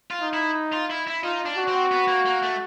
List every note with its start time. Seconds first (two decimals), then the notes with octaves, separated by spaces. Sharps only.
0.11 F4
0.21 D#4
0.34 E4
0.72 F4
0.90 E4
1.07 E4
1.23 D#4 F4
1.46 D4
1.58 F#4
1.68 C4
1.92 B3
2.08 A#3
2.26 A#3
2.42 A3